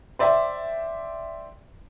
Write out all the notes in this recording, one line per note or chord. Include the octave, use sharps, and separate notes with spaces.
C5 D5 E5 G5